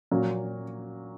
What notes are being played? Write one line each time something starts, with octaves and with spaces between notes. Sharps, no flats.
A#2 F#3 A#3